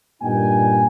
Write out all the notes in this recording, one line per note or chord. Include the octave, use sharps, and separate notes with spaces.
G2 A#2 D#4 G5 G#5